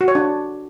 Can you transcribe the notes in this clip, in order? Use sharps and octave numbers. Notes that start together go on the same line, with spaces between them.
F#4
C#5
D4